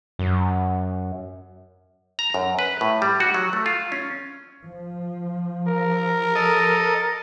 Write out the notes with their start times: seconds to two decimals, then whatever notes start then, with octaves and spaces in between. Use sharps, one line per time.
0.19 F#2
2.19 A#5
2.34 F#2
2.59 B4
2.81 A2
3.02 G3
3.20 F#4
3.34 F#3
3.53 A3
3.66 F4
3.92 C#4
4.65 F3
5.67 A#4
6.36 A4 D#5